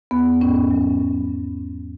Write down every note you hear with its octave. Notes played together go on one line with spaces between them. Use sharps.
E2 B3
G#2 C#4
F#3
F#3